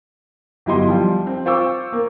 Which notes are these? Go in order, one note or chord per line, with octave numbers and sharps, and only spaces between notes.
G1 F#3 E4 G4 D#5 C6
F3 G3
C4
F4 C5 C#6 D6 E6
A#3